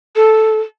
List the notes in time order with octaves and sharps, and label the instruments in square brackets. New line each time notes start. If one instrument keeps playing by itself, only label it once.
[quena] A4